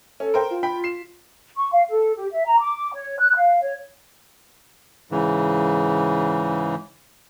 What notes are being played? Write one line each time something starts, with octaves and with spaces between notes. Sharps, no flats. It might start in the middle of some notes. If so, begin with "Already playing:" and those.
C#4 A4
A#4 C5 G5
F4
G5 B5 B6
C7 E7
C#6
F5
A4
G4
E5
A#5
D6
C#5
F#6
F5
C#5
G#2 C#3 E3